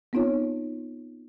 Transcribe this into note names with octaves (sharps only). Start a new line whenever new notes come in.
B3 C4 D#4 F4 C#5